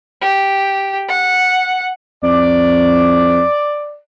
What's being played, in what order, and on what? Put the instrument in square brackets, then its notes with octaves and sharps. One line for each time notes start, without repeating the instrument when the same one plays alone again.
[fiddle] G4
F#5
[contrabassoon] F2 [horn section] D5